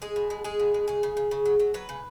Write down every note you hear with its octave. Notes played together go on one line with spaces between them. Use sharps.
G#3 G#4
B2
G#3
G#3 G#4
B2
G#3
C#3 G#4
C#3
C#3
C#3
F#3
F#3
F#3 B4
C#3